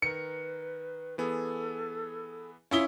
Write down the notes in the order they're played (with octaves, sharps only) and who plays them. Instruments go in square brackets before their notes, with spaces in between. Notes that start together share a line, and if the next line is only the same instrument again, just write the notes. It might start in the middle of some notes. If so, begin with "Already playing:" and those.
[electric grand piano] D#3 A#4 [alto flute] B4 [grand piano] C#7
[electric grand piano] E3 B3 G#4 [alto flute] A4
[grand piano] C#4 E4 G7 [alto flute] F4 [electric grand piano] F5 D#6 B6